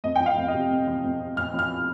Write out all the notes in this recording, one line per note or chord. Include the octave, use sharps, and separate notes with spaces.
F2 D#5
F3 G5
F5
F2
D#5
C3
F2
F3
F2
C3
F2 F6
F3 F6